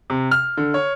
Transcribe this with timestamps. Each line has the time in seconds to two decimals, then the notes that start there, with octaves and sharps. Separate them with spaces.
0.10 C3
0.31 F6
0.57 D3
0.74 C#5